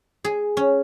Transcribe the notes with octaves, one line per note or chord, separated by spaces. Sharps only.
G#4
C#4